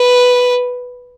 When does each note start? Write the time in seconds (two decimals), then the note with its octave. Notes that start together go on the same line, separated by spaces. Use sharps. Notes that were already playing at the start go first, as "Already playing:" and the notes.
Already playing: B4